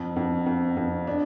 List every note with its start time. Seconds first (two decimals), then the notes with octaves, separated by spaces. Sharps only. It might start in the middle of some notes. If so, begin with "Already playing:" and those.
Already playing: F2
0.16 F2
0.46 F2
0.77 F2
1.07 D4